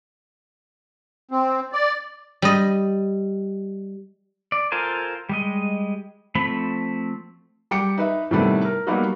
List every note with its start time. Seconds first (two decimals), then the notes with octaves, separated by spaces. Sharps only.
1.31 C4
1.73 D5
2.42 G3 D#5
4.52 D5
4.72 F4 A4 A#4 C5 G#5
5.29 G3 G#3 D#5
6.35 F3 A3 C4 B5
7.71 G3 G5 D6 C#7
7.98 D#4 B4 E5
8.31 A2 C3 D#3 G3 A3 B3
8.65 A#4
8.87 F#3 G3 A#3 B3 D#4 F#4